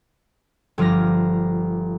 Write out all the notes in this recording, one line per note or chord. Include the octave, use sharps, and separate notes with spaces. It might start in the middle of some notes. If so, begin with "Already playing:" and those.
G1 F3 D6 F6 A#6